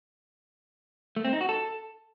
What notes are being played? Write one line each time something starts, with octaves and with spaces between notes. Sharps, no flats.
A3
C4
D#4
F#4
A4